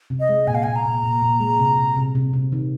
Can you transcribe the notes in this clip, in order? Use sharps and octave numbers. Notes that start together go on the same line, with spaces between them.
C3
D#5
G#3
A#2 G#5
F5
A#2 G#5
A#5
A#2
A#2
A#2
G#3
C3
C3
C3
C3
C3
D#3